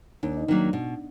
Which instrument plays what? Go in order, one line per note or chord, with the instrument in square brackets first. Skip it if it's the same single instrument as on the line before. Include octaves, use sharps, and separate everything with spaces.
[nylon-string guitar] D#2 [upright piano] D4
[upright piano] D#4
[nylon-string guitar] D#3 F#3 A#3 [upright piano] D4
[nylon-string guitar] B2